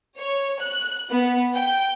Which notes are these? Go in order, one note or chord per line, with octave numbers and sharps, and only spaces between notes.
C#5
F#6
B3
G5